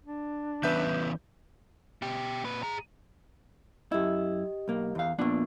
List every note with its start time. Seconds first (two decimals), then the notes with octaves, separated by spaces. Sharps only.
0.04 D4
0.63 E3 B3 C#4 B4 E5 G6
2.02 B2 G4
2.44 A#2 B4
2.63 G#4 A#5
3.92 F#2 E4 G4 D#5
4.68 B1 A#3
4.95 E2 F5
5.18 F2 A#2 A#3 B3 D4